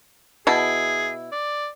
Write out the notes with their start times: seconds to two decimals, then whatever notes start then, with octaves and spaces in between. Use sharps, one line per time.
0.47 B2 E4 G#4
1.32 D5